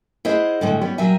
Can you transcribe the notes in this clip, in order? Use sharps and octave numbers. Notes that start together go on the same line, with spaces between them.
E4 G#4 C5 D#5 F#5
A2 D3 G3 G#3
G3 B3 C#5
A#2 F#3 G3 A#4 E5 G#5